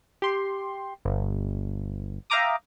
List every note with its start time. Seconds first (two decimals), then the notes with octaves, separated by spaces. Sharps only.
0.22 G4 C6
1.05 G1
2.30 E5 F5 G5 A#5 D6 D#6